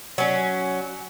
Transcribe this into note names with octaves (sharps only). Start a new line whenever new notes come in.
F#3 C#4